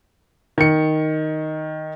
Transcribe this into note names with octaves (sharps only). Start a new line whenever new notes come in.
D#3 C#7